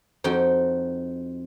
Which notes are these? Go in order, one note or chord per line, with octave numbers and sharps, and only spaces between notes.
F2 D#4 F#4 G5